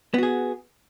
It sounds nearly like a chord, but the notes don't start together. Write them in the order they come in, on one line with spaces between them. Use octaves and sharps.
B3 F#4 G#4